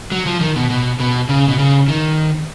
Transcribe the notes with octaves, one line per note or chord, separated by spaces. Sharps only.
F#3
F3
D#3
B2
B2
B2
C#3
B2
C#3
D#3